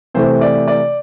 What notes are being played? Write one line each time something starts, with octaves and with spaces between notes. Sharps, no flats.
C3 E3 A3 C5
D5
D5